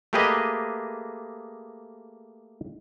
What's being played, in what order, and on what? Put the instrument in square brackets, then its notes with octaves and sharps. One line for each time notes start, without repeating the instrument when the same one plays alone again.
[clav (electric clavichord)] A3 A#3 G4 G#4 B4 D#5